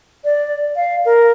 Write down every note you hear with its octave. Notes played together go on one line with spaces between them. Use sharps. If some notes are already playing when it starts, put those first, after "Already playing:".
D5
F5
A#4